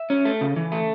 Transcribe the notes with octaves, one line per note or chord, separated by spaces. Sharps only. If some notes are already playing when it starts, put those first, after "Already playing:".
Already playing: E5
C#4
A3
C#3
E3
A3